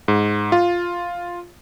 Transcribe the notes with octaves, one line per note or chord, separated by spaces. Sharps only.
G#2
F4